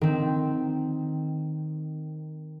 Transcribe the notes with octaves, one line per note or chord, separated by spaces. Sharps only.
D#3 C4